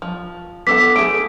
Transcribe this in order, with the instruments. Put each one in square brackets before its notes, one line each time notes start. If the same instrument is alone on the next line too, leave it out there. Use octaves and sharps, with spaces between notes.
[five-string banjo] F3
[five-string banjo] B3 A4 F#5 [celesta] D6 B6
[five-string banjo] A3 G#4 [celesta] D7